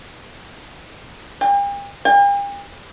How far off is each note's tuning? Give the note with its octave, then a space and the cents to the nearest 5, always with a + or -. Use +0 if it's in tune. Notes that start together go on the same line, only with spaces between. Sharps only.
G5 +45
G5 +45